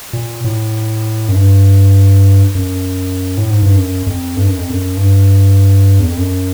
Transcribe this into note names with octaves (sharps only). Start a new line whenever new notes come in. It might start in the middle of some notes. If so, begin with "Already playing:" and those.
A#2
A2
F#2
G2
F#2
A2
G#2
G2
F#2
F2
G2
F#2
F2
F#2
G2
E2
F2
F#2